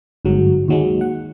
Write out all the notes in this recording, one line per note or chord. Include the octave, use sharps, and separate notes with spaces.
G1 G#2 F#3
D#2 F#3 G#3
F#5